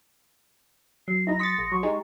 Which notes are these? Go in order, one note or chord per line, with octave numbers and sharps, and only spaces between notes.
F#3 C7
B1 D#4 E4 A#6
C6 D#6 A6 B6 C#7
A#1 A#6
F#3 C#6
G#3 D#4 G4